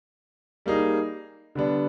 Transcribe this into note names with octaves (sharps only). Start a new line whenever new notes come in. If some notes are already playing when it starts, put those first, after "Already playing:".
G3 A#3 D#4 G#4
D3 G3 B3 D4